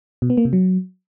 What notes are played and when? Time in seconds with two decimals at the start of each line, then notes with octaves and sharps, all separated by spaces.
0.22 B2
0.30 B3
0.37 A#3
0.45 C3
0.53 F#3